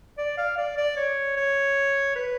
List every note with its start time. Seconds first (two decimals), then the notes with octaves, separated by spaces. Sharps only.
0.18 D5
0.38 F5
0.57 D5
0.77 D5
0.97 C#5
1.37 C#5
2.16 B4